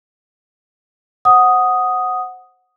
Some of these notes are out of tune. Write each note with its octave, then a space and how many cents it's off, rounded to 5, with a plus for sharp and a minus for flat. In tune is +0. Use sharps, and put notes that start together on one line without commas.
C5 +0 F#5 +0 D#6 +0